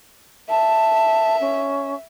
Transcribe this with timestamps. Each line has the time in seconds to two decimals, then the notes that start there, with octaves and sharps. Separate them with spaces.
0.50 E5 A5
1.41 C#4